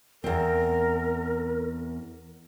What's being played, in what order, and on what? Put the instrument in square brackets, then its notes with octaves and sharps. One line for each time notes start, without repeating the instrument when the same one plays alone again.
[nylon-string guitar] E2 C4 [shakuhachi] A#4